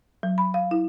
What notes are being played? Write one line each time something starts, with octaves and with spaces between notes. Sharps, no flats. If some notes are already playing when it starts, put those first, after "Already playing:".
F#3
B5
F5
E4